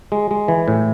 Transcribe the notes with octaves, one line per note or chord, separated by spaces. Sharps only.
G#3
G#3
E3
A2